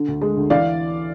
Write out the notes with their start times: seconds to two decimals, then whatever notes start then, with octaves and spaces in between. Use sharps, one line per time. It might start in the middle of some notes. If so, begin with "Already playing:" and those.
Already playing: D3
0.08 D2
0.22 G#3
0.37 D2
0.50 E3 D5 F5